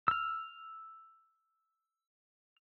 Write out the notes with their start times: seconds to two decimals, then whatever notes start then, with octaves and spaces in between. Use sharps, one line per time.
0.08 E6 F6